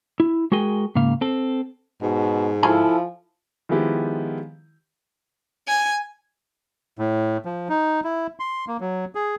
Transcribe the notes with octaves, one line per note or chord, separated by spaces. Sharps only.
E4
G#3 F#4 G#4 A#4 G5 G#5
G#2 C#3 A#3 F5
C4 A4
G#2 B2
F3 E4 A4 F5 G#5
D#3 F3 G#3 B3 E4 G4
G#5
A2
F3
D#4
E4
C6
A#3
F#3
G#4